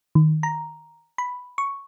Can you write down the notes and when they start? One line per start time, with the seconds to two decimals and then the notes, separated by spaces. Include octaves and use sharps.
0.15 D#3
0.43 A#5
1.18 B5
1.58 C#6